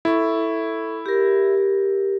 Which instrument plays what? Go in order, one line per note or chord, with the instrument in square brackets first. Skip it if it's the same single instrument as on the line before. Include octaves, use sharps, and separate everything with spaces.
[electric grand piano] E4 [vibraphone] A4 C#6
[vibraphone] G4 A#4